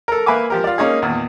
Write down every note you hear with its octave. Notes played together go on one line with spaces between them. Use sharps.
A4 A#4
A#3 B4 E5 G#5 D6
F3 G4 A#4
F4 D5
A#3 C#4 D#4 G#4
E2 A#2 D#3